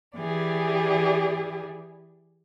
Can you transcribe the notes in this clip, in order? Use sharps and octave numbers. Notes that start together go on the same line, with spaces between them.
E3 G4 G#4 D5